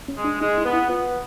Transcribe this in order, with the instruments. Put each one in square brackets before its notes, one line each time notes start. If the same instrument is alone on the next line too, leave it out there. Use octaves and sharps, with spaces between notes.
[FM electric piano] C#4
[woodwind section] G#3
[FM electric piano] D4
[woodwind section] G#3 [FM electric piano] D#4
[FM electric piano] E4
[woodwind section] B3
[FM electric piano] E4
[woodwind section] B3 [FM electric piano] F4